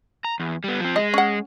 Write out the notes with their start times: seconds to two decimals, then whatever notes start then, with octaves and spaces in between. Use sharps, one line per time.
0.25 A#5
0.40 E2
0.64 G3 B3
0.80 F3 C4
0.96 G#3 D#5
1.14 C#4 F#5